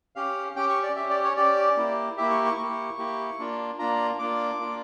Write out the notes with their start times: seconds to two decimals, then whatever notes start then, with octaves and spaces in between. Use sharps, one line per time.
0.16 C#4 G4 F5
0.56 C#4 G4 G5
0.69 C#6
0.83 D5
0.96 C#4 G4 E5
1.10 D5
1.24 C#5
1.37 C#4 G4 D5
1.77 A#3 E4 G4
2.17 A#3 E4 G4 E5
2.30 C#6
2.45 C#6
2.57 A#3 E4 G4 C#6
2.98 A#3 E4 G4
3.39 A#3 D4 F4
3.78 A#3 D4 F4 A#5
4.19 A#3 D4 F4 D6
4.59 A#3 D4 F4